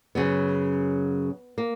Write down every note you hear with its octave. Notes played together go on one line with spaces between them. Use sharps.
F#2 C#3 F#3 B3
A#3